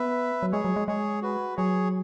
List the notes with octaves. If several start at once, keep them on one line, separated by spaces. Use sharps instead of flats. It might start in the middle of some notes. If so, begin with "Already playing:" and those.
Already playing: B3 B4 E5
F#3
G#3 G#4 C#5
F#3
G#3
G#3 G#4 C#5
F#4 B4
F#3 G#4 C#5